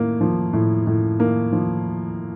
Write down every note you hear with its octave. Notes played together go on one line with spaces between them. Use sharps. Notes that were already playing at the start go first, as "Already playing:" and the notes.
Already playing: A2 A#3
F3
A2
A2
A#3
F3